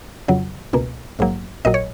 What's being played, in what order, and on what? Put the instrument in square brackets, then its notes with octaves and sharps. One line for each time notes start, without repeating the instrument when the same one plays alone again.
[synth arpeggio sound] F2 C#3 F#3
C#2 B2 A#3
A#1 G#2 F#3 A#3
A#1 A#2 F#3 D#5
C#5